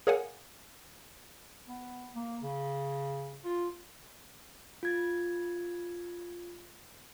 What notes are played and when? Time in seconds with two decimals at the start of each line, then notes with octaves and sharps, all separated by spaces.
0.07 G#4 A#4 C#5 F5 F#5 G#5
1.68 B3
2.16 A#3
2.42 C#3
3.45 F4
4.83 F4 G#6 A6